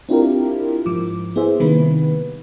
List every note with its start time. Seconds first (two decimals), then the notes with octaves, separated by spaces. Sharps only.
0.09 C4 D4 E4 F4 G4 A#4
0.86 G#2 F3 D6
1.36 B3 E4 G#4 C5 E5
1.60 C3 D#3 G3 A#3 B3 B4